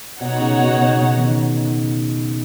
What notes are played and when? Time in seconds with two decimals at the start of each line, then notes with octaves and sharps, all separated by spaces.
0.20 B2 D#4 F#4 C#5 F#5
0.40 C#3
0.59 B2
0.78 B2
0.99 B2
1.18 D#3